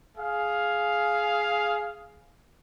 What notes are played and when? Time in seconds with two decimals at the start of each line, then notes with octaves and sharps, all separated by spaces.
0.17 G#4 F5